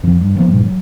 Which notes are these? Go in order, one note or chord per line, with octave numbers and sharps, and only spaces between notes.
F2 F3
G2
F3 A#3 B3
G2 A#2
F#3